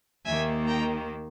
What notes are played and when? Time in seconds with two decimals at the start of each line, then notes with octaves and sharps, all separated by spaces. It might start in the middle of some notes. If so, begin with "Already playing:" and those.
0.25 D#2 D#3 A#3 E5 G#5
0.67 G5 A#5